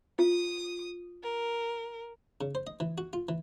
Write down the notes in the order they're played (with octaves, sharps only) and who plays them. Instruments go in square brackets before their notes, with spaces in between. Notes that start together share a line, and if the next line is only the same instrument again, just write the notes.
[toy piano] F4 [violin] D#6
[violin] A#4
[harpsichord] C#3
C5
D#5
E3
F#4
F4
E3